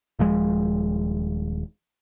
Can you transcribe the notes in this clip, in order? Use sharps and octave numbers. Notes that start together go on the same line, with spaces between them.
D#1 F3 G#3